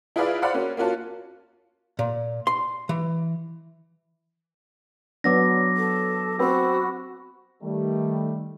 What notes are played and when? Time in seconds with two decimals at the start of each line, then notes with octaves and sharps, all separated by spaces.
0.16 E4 F4 G#4 B4 D5 F5
0.42 C5 D5 F5 F#5 B5
0.54 A#3 C#4 F#4
0.77 A#3 C#4 F4 F#4 A5
1.99 A#2
2.47 C6
2.89 E3
5.24 F#3 B3 D4 D6 E6 A#6
5.76 A4
6.39 C4 F#4 B5 E6
7.62 D#3 G3 A3